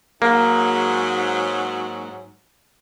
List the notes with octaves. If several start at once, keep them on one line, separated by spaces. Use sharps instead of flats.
G#2 F#3 A#3